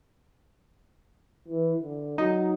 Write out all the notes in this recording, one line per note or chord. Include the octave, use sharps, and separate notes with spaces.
E3
D3
F#3 D#4